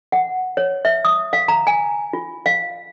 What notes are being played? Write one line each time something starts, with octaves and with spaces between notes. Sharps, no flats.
F#5
C#5
E5
D#6
F5
A#5
G#5
F4
F5